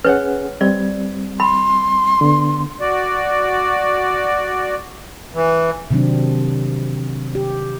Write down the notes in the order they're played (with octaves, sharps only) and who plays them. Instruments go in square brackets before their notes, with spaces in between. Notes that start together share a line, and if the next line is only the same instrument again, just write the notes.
[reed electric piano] C#4 G#4 F#5 [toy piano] B4 C#5
[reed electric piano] G3 C4 [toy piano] D5
[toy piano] B5 [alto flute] C6
[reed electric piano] D3 B3
[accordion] F#4 D5
E3
[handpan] C3 D#3 F#3 C4 D4
G4